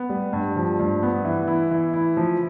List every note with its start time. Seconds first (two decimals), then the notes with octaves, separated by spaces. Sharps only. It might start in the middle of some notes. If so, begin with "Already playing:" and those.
Already playing: B3
0.10 G3
0.33 G2
0.56 F3
0.80 G2
1.03 B3
1.25 E3
1.47 E4
1.71 E3
1.93 E4
2.17 F3